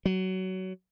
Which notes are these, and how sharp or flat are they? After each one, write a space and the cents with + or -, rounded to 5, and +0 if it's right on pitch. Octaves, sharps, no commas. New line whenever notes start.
F#3 +20